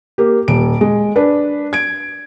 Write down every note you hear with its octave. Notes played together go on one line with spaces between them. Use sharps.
A#3 G4
D#1 D7
G#3
D4 B4
G#6 D7